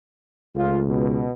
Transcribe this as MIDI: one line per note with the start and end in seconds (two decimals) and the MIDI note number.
0.55 1.24 37
0.55 0.81 57
0.55 0.81 61
0.55 0.81 65
0.87 1.30 47